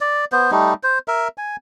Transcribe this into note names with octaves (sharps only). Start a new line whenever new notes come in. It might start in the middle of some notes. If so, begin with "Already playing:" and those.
D5
B3 C5
G3 A3 D#4
C5
A#4 E5
G#5